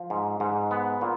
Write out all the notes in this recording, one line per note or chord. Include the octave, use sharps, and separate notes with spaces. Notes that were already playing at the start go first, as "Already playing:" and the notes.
Already playing: F3
G#2
G#2
B3
A#2